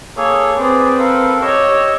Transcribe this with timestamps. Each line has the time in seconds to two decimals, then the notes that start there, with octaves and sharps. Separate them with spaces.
0.17 A#3 G#4 A4 C#5
0.57 C4 G#4 B4 D5
0.99 A4 A#4 F5
1.42 G4 C#5 D#5 C#6 E6